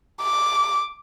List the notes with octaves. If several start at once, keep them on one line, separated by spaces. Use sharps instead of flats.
D6